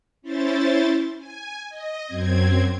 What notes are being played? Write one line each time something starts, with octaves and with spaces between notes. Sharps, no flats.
C#4 E4 C5 A6
G#5
D#5
F#2 C4 G#6